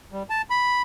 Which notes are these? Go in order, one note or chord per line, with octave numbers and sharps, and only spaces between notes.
G3
A5
B5